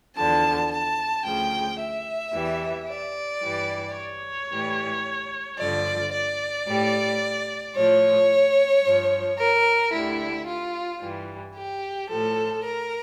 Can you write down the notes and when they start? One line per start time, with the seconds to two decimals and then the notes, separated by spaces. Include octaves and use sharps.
0.16 E2 D3 F3 A5
0.71 A5
1.25 D2 C#3 F3 G5
1.79 E5
2.33 E2 E3 G3
2.87 D5
3.41 G2 E3 G3
3.96 C#5
4.50 A2 E3 G3
5.59 G2 D3 F3 D5
6.13 D5
6.67 A2 G3
7.75 A2 F3 C#5
8.83 G2 F3
9.38 A#4
9.92 D2 D3 G3 E4
10.47 F4
11.01 G2 E3 G3
11.55 G4
12.09 A2 F3 A4
12.63 A#4